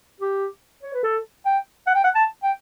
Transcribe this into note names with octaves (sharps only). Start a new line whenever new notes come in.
G4
C#5
B4
A4
G5
F#5
G5
F#5
A5
G5